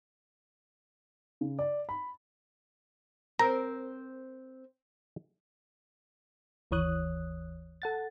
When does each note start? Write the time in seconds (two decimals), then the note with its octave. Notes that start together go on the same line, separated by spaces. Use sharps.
1.41 C#3
1.59 D5
1.89 B5
3.39 C4 A#4 A#5
6.71 G1 D#2 E3 C#5 D#6 F#6
7.82 A4 F#5 A6